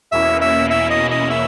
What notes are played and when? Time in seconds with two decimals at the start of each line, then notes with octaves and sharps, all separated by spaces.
0.12 E2 B2 A#3 C#4 E4 E5
0.41 E5
0.70 E5
0.90 D#5
1.11 D#5
1.30 E5